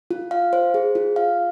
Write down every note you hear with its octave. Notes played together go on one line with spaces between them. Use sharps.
F4
F5
C5
G#4
F4
F5